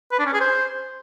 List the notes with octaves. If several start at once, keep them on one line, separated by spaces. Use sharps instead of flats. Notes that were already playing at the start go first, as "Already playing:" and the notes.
B4
D4
C#4
G#4
C5